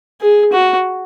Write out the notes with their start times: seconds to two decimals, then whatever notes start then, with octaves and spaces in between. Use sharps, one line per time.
0.21 G#4
0.52 F#4